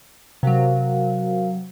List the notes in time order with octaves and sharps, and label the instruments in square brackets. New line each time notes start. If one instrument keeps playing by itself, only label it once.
[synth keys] C3 F#3 [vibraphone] F#4 A#4 F5